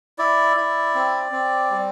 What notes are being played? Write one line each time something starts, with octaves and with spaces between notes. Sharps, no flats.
E4 D5
E4
C4
C4
G3